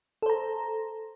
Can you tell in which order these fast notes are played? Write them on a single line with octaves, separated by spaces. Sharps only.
A4 C5 A#5